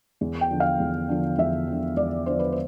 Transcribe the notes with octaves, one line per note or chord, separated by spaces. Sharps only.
E2
G5
D3 F3
F5
E2
D3 F3
E2 E5
D3 F3
E2 D5
D3 F3 C5
B4
C5